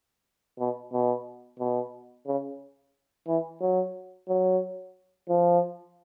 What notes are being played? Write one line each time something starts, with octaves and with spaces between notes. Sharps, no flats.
B2
B2
B2
C#3
E3
F#3
F#3
F3